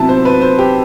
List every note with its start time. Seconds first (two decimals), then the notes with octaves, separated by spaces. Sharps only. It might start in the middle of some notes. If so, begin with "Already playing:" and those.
Already playing: C3 F#3 B3 E4 A5
0.09 C5
0.25 B4
0.42 C5
0.59 G4